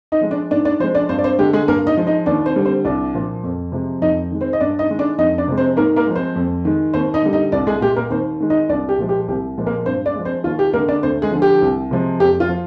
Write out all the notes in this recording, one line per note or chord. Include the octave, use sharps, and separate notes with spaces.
D#4 D#5
F3 G#3
D4 D5
G#2 D4 D5
D4 D5
F3 G#3 C4 C5
D4 D5
G2 C4 C5
D5
C4 C5
D3 G#3 G4
G#3 G#4
G2 A#3 A#4
D#4 D#5
F3 G#3
D#4 D#5
D#2 D4 D5
C4 C5
D3 G3
C4 C5
C2 D4 D5
A#2 F3
F2
C3 F3 G#3
F2 D#4 D#5
D#3 G#3
C4 C5
D#5
G2 D4 D5
D#4 D#5
D#3 G#3
D4 D5
F2 D#4 D#5
D4 D5
C3 F3 G#3
C4 C5
G#2 A#3 A#4
A#3 A#4
F3 G#3
C4 C5
F2
D#3 G#3
D#2 C4 C5
D#4 D#5
D3 G3
D#4 D#5
C2 D4 D5
G#3 G#4
A#2 G#3 G4
A#3 A#4
D#2 C4 C5
D#3 G#3
D#4 D#5
C2 D4 D5
G4
A#2 F3 G#3
G4
C2 G4
A#2 F3 G#3
A#3 A#4
G2 C4 C5
D4 D5
F3 G#3
C4 C5
D#2 F4
G4
D3 G#3 A#3 A#4
D4 D5
D2 C4 C5
G#3 G#4
D3 F3
G4
C2
C3 F3 G#3
F2 G4
F4
F3